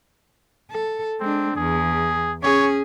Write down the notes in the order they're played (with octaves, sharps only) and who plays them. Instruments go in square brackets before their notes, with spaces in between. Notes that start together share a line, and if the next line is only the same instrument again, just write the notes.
[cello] A4
[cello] G#3 D4 [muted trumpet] C4
[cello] E2 [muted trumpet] G#4
[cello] C#4 G#4 [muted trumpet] C#5